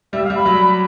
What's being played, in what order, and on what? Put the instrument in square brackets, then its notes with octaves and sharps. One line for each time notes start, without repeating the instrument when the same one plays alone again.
[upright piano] G3 [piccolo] E5
[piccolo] F5
[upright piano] G3
[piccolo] B5
[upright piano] F#3